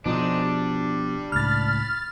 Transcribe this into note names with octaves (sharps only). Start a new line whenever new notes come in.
B2 F3 G#3 C4 D4 D#4
G3
C#2 A2 B5 F6 A6